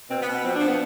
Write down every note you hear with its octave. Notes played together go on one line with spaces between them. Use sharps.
B2 C4
B3
B2
B3
F3 C4
F3 D4
B3